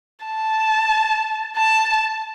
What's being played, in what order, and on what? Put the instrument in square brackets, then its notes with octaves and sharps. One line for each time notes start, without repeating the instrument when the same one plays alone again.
[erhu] A5
A5